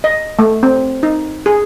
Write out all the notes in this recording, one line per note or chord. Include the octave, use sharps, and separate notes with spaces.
D#5
A3
C4
D#4
G#4